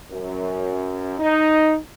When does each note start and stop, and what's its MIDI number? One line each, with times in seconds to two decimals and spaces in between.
0.11 1.19 42
1.19 1.75 63